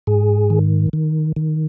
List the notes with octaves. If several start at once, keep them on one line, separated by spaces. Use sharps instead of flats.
G#2 G#4
D#3
D#3
D#3